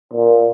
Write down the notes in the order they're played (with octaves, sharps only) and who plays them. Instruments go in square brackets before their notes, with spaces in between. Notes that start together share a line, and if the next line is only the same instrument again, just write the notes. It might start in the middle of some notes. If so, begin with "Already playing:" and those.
[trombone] A#2